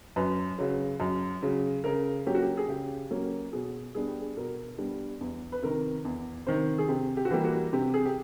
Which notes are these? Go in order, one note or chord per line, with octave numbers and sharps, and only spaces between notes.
F#2 B4
C#3 F#3
F#2
C#3 F#3
C#3 A#4
F#3 A#3 C#4 G4
F#4
G4
G#4
C#3 G4
F#3 A#3 C#4
B2 G#4
G3 B3 D4 G#4
G4
G#4
B2 A#4
G3 B3 D4
E2
B4
C3 D#3 A#4
E2
C3 D#3 C5
G#4
C3 G4
G4
F#4
E3 G3 A#3 G4
F#4
C3 G4
G#4
G4